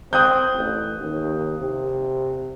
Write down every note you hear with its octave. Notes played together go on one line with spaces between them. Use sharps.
C4 D#6 F#6 G6
A1
D#2
C3